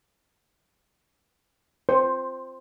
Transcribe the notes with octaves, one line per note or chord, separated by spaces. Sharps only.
C5